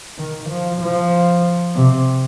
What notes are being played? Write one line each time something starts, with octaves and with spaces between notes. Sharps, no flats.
D#3
F3
F3
C3